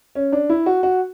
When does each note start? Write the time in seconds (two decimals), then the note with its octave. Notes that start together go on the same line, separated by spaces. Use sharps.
0.15 C#4
0.33 D4
0.50 E4
0.66 F#4
0.83 F#4